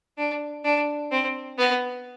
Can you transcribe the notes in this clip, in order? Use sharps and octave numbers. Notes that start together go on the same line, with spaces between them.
D4
D4
C4
B3